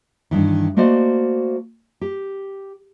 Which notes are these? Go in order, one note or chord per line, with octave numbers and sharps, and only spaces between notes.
G2 D#3 E3
A3 A#3 F#4 C5 D5 D#5
G4